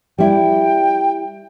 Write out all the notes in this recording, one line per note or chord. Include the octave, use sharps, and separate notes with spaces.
G3 E4 G5